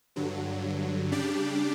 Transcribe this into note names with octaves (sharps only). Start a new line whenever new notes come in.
G2 D3 F#3
C#3 G3 D4 G4 D5